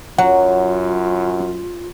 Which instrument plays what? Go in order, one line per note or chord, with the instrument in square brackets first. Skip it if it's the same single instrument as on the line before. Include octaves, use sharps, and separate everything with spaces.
[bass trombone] F#2 [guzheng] F#3 [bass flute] F4 [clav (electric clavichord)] F#5